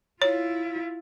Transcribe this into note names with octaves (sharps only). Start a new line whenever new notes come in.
E4 F4 C#5